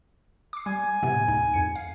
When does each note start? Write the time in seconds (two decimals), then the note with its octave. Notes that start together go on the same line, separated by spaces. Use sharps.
0.53 D6 C7
0.66 G3 G#5
1.03 A2 C3 B3
1.28 D2 D#4
1.54 F2 C#7
1.75 F5